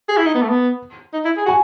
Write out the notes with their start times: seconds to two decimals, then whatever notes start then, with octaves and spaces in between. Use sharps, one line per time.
0.09 G#4
0.17 E4
0.26 D#4
0.34 B3
0.42 A3
0.49 B3
1.13 D#4
1.25 E4
1.37 G#4
1.46 F#4 G#5